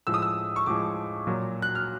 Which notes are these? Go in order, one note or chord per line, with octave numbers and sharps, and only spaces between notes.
A2 F3 G#3 E6
D#6
E6
C#6
A2 F3 G#3 D6
A#2 F#3
F#6
F6